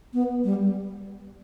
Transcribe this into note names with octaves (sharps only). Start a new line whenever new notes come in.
B3
G3